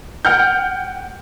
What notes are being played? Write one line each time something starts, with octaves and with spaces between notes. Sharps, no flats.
F#5 G5 F6 G6